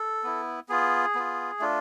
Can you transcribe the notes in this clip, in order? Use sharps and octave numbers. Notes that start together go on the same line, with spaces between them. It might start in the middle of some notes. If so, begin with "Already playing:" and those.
Already playing: A4
B3 E4
B3 F4 G#4
B3 F4
A3 D4 F4